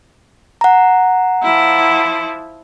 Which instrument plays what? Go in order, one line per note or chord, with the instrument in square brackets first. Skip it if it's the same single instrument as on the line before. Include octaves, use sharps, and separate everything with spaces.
[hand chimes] F#5 A#5
[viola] F3 E4